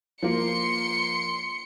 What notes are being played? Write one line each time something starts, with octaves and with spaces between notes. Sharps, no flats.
F3 A#3 C6 C#7